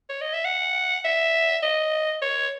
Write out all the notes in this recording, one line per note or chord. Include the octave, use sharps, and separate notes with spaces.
C#5
D#5
E5
F#5
E5
D#5
C#5